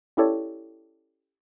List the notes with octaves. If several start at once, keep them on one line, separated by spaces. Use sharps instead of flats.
C#4 E4 G4 A4 C#5 D5